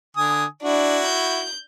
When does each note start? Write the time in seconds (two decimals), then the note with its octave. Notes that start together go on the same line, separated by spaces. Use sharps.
0.17 D3 G#5 D#6
0.62 D4 E4 F#4
1.07 G6